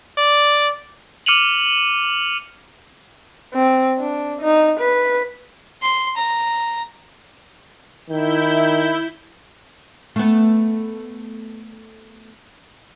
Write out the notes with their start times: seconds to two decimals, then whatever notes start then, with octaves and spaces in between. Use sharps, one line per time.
0.18 D5
1.26 D6 F6 C#7 D#7 F7 F#7
3.54 C4
3.99 D4
4.41 D#4
4.80 B4
5.82 C6
6.17 A#5
8.09 D#3 E4 G6
10.16 A3 B3